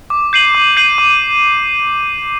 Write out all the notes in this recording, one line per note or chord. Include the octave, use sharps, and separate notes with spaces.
D6
G6 C7 D#7 F#7
D6
G6 C7 D#7 F#7
D6